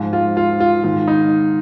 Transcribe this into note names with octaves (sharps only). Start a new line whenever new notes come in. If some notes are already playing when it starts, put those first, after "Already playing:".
Already playing: G#2 F3
F4
F4
F4
G#2 D#3 F4
D#4